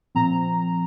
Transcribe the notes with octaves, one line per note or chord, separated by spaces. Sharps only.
A#2 F3 C4 A#5